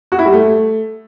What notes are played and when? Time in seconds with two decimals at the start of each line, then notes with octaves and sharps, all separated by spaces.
0.12 F#4
0.19 E4
0.26 G3
0.32 A3